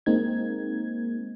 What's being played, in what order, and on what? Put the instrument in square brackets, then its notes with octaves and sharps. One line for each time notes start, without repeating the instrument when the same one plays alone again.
[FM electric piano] G#3 A#3 C4 D#4 G#6